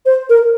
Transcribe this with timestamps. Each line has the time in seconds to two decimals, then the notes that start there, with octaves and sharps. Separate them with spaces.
0.06 C5
0.30 A#4